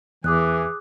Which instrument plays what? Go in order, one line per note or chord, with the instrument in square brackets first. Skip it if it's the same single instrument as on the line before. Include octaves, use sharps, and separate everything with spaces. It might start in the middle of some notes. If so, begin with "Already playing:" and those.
[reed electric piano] E2 [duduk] E3 [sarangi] G#4 [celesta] D6 D#6 F#6